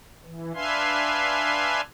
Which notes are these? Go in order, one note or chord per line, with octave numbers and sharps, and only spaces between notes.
E3
D4 B4 E5 F5 G#5 C6